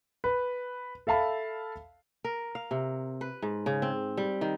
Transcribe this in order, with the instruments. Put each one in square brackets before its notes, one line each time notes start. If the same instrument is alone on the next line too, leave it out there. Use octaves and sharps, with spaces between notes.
[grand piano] B4
A4 E5 F5 A5 B5
[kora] A#4
F5
C3
B4
G#2
C#3
C4
G3
D#3